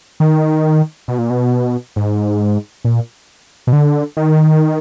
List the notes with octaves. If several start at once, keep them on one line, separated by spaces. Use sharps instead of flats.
D#3
B2
A#2
B2
G#2
A#2
B2
D3
D#3